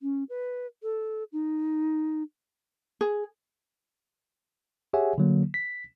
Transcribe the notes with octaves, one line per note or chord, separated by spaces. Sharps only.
C#4
B4
A4
D#4
G#4
G4 G#4 C#5 E5 F#5 G#5
D3 F#3 A#3
B6